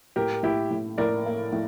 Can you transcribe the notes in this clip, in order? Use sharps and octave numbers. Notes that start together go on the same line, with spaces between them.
A2 G4 A#4
A2 E4 G4
A2
A2 A#4 D5
A#3
A2